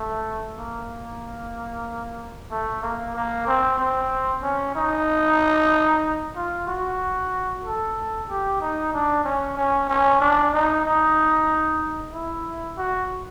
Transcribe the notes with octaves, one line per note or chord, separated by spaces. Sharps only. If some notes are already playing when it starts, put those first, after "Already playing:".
Already playing: A3
A#3
A3
A#3
A#3
C4
C4
C#4
D#4
F4
F#4
A4
G4
D#4
D4
C#4
C#4
C#4
D4
D#4
D#4
E4
F#4